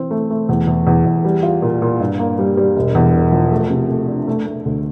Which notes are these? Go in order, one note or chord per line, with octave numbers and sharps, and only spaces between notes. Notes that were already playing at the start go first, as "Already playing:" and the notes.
Already playing: E3 C4
A3
A3
E2
E2
E2
E2
G3
F4
A#2
A#2
G2
A#3
G3
G3
E1
E2
E1
F3
A3
C3
A3
D4
A3
A3
D2